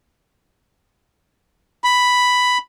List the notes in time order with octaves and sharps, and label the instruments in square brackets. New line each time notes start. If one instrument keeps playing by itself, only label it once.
[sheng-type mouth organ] B5